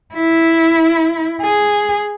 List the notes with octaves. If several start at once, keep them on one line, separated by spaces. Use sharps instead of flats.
E4
G#4